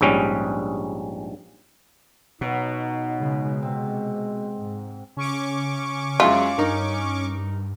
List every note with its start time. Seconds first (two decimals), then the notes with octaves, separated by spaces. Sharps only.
0.01 A#1 G#2 G3 C#4
2.41 B2 F#3 D#4 B4
3.19 C#3 G#3
3.63 C3 G#3 C4
4.56 G#2
5.17 C#3 C#4 C#6 D6
6.20 F#2 G#3 F4 E5
6.58 G2 D#4 A#4